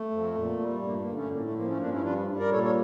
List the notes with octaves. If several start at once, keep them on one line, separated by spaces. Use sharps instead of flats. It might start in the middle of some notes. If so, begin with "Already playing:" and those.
Already playing: A3
F2
A#2
G3
G2 A#3
A#3
D3
A3 C#4
A2 A#3
A3
F3 A#3
A3 C#4
G2 A#3 D4
C#4 E4
G3 D4 F4
G3
A#4 D5
A#2 A4 C#5
A4 C#5